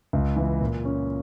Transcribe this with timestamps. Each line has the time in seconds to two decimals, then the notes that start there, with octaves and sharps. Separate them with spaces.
0.13 C#2
0.36 E3
0.61 A#2
0.85 C#4